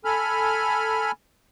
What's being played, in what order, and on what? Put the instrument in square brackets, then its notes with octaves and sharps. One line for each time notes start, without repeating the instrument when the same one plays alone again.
[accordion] A4 G#5 B5 F6